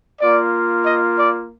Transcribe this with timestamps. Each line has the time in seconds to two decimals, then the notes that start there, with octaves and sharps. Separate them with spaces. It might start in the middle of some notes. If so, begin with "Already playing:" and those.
0.19 A#3 F4 D5
0.86 D#5
1.19 D5